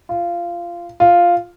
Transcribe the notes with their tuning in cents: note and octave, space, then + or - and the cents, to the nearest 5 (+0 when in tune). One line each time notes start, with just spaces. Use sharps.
F4 -15
F4 +0